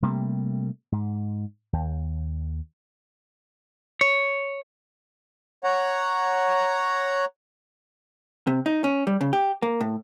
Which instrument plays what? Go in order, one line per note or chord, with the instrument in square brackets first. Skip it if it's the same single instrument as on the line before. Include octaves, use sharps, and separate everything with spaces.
[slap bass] C3 G3 A3 A#3
G#2
D#2
[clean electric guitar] C#5
[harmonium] C#5 F#5 A#5
[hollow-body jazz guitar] C3
D#4
C#4
G3
C#3
G4
A#3
A2